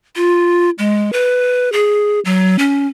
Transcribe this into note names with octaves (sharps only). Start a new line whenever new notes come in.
F4
G#3
B4
G#4
F#3
C#4